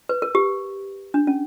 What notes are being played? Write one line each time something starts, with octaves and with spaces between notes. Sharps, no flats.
B4
A#4
G4
D4
C#4